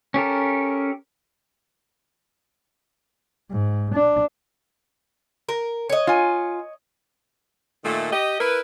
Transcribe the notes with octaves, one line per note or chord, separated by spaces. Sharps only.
C#4 G4 A4 A#4
G#2
D4
A#4
C#5 D#5
F4 G#5
A#2 D#3 A3
G4 D#5
E4 A#4 B4